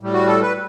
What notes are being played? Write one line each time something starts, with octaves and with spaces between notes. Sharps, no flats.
A2 G3
F#4
A4
B4